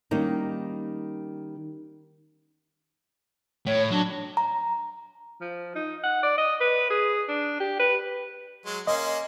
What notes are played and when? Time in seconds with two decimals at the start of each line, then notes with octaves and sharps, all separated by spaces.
0.11 D#3 G3 A#3 C#4 D#4
3.66 A2 C#5
3.91 F#3 D4
4.37 A#5
5.41 F3
5.75 D#4
6.04 F#5
6.23 D5
6.38 D#5
6.61 B4
6.90 G#4
7.28 D4
7.60 G4
7.79 B4
8.66 F#3 G#3
8.87 A#3 C#4 D#5 C6